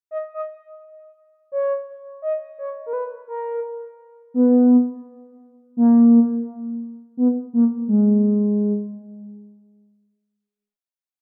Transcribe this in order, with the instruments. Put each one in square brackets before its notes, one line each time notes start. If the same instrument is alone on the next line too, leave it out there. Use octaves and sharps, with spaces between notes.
[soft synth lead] D#5
D#5
C#5
D#5
C#5
A#4
B4
A#4
B3
A#3
B3
A#3
G#3